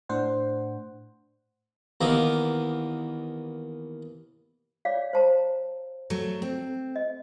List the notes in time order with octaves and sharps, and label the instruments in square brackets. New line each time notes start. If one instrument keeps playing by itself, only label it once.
[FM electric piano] A2 D4 C5 F#5
[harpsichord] D#2 E3 A#3 B3 D#5 D6
[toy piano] C#5 D5 F5
C5 A5 A#5
[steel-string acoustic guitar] F#3 A3
C4
[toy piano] D#5